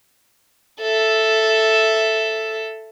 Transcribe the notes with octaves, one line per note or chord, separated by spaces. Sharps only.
A4 E5